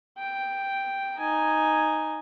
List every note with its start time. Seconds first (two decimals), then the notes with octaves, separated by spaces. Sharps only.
0.19 G5
1.18 D#4 G#5